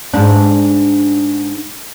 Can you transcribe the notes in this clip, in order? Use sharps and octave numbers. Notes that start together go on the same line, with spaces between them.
G#2 D4